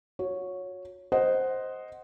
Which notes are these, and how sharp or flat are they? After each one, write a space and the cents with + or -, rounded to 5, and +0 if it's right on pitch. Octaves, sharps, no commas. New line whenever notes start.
F#4 -35 C#5 +0
C5 +0 D#5 +0 F#5 +10